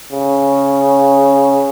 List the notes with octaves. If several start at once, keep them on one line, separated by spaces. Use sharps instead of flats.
C#3